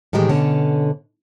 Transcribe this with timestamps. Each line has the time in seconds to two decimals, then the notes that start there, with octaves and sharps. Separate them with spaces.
0.13 A2 D#3 E3 G#3 G4 G#4
0.29 B2 D3 C#4 C#5 A5